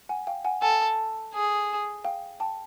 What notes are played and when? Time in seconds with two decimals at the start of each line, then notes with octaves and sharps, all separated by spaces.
0.09 F#5 G#5
0.27 F5 G5
0.45 F#5 G#5
0.62 A4 F#5 G#5
1.34 G#4
2.05 F5 G5
2.40 G5 A5